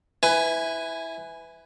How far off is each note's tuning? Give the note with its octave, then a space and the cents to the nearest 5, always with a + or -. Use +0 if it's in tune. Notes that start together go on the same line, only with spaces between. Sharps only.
E4 -10 B4 +20 G#5 +0